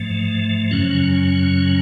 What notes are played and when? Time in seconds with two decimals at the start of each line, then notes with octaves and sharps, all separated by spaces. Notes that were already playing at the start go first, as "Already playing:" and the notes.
Already playing: G#2 F3 A3
0.71 F#2 C#3 F#3 C#4